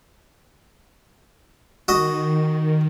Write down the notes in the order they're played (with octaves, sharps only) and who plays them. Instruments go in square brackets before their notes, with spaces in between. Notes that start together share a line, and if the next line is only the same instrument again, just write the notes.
[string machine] D#3 [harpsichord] F#4 D#5